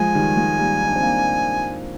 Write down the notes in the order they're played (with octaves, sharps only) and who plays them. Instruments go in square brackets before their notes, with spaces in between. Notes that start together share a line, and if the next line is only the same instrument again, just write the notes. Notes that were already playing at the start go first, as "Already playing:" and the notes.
Already playing: [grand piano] F3 G#3 [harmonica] G#5
[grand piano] D#3 G3
F3 G#3
G3 A#3
D#4
D4
C4
A#3 D4